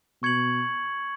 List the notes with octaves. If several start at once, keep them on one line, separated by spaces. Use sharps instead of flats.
B2 C#6 G#6 C#7 F#7